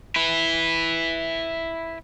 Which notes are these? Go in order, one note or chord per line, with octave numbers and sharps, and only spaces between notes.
E4 B4